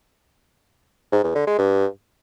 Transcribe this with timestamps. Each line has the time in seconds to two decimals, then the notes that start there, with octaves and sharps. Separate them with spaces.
1.12 G#2
1.24 E2
1.35 D3
1.47 G#3
1.58 G2